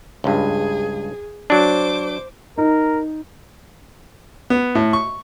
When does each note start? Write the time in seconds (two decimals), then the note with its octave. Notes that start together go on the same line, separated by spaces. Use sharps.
0.24 C#2 G2 G#4
1.50 F#3 D4 C5 D6
2.58 D#4 A#4
4.50 B3
4.75 A2
4.93 C#6